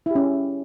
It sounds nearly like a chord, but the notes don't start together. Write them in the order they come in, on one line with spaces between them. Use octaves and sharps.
E4 G4 C#4